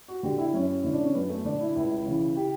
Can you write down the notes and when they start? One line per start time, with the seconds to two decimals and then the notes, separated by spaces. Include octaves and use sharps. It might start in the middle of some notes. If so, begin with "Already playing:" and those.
0.08 F#4
0.23 D3 G4
0.38 E4
0.53 F#2 C#4
0.83 D3 E4
0.93 D4
1.04 C#4
1.15 F#2 B3
1.30 A3
1.45 D3 D4
1.61 E4
1.76 C#2 E4
2.06 C#3 E3
2.36 G4